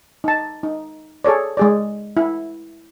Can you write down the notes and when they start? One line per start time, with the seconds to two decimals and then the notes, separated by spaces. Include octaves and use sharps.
0.24 D#4 A5
0.63 D#4
1.25 G#4 A4 C#5 D5
1.57 G#3 G#4 D5
2.17 E4